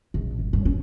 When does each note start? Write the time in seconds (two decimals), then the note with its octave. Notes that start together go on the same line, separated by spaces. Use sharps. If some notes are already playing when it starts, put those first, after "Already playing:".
0.14 A#1
0.39 G1
0.53 G2
0.65 C#4